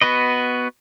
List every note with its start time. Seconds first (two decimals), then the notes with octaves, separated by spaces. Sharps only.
0.01 B3 F#4 B4 D#5